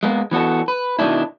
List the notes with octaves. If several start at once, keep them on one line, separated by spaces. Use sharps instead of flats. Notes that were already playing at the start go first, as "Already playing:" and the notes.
G#3 A#3 B3
E3 B3 F#4 A4
B4
B2 D#3 G3 C#4 D4 E4